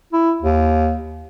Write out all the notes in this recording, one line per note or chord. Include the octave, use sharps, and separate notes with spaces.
E4
D#2